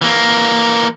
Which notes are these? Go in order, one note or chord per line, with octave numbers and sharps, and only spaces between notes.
E3 A#3